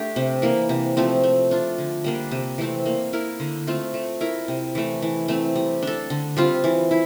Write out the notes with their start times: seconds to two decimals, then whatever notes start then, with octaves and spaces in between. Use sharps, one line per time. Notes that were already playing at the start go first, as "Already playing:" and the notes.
Already playing: A3 D4 G4
0.16 C3
0.42 E3 A#3
0.69 C3
0.97 F3 A3 C4
1.23 A3
1.51 D4 F4
1.78 D3
2.04 G3 A#3 D4
2.31 C3
2.58 E3 A3 C4
2.86 A#3
3.13 E4 A#4
3.40 D3
3.67 A3 C4 F4
3.94 A3
4.21 E4 A#4
4.48 C3
4.75 E3 A3
5.02 E3
5.28 A3 C4
5.55 G3
5.83 D4 A4
6.10 D3
6.37 G3 C4 F4
6.64 E3
6.91 E4